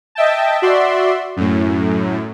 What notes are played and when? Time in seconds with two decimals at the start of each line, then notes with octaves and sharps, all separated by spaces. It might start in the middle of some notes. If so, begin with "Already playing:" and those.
0.15 D#5 E5 G5 A5
0.62 F#4 D5 E5 C6
1.37 F#2 A2